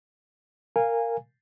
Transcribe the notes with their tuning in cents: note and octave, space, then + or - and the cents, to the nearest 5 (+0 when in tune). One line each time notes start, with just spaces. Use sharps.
A#4 -10 F5 -5 G#5 -20